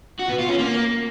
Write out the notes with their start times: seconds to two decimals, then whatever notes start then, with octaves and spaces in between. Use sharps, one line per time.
0.20 F#4
0.29 B3
0.39 F4
0.49 C#4
0.59 A#3